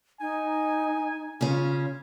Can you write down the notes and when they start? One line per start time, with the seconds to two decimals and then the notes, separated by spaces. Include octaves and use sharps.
0.21 D#4 G#5
1.41 C#3 C#4 F4